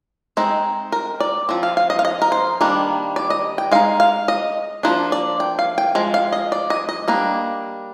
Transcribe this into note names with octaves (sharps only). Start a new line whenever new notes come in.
G#3 C4 D#4
A#4
D5
F3 C4
F5
F5
D#5
F5
D#5
A#4
C5
D#3 G3 A#3 D4
D5
D#5
G5
G#3 D#4 F5
F5
D#5
F3 A#3 D4 C5
D5
G5
F5
G5
F3 G#3
F5
D#5
D5
D#5
D#5
G3 A#3 D4